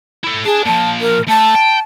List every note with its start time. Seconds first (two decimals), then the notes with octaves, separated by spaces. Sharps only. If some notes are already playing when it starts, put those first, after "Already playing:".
0.24 E4 A4
0.45 D4 G#4 A5
0.65 A#2 F3 A5
1.01 A#4
1.28 A3 A5
1.55 G5